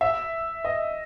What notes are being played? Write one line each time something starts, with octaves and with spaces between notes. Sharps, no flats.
E5
D#5